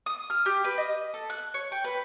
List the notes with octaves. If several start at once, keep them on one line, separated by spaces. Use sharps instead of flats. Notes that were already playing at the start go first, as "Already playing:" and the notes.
D#6
F6
G4
B4
D#5
A4
F#6
C#5
G5
B4